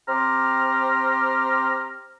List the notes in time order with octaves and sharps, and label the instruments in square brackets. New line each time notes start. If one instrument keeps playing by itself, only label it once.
[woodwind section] C4 G4 A#5 C6 F6